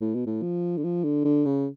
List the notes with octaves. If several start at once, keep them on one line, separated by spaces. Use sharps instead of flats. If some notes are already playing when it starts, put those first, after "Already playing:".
A2
B2
A2
F3
D3
F3
D3
D3
C#3